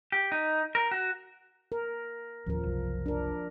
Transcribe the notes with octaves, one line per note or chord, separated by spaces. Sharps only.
G4
D#4
A#4
F#4
A#4
D1 D#2 F3 C#4 A#4
F#1 C2 F#3
D4 A#4